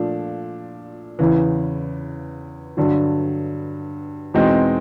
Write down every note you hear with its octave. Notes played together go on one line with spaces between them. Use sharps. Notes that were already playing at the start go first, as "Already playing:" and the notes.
Already playing: A#2 F3 A3 D4
E2 C#3 E3
G2 D3 F#3
E2 B2 G#3 C4 D#4